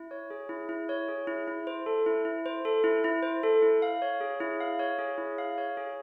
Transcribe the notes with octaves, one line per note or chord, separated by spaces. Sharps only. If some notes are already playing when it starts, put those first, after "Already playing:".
Already playing: E4
C#5
G#4
E4
E4
C#5
G#4
E4
E4
C5
A4
E4
E4
C5
A4
E4
E4
C5
A4
E4
F5
C#5
G#4
E4
F5
C#5
G#4
E4
F5
C#5
G#4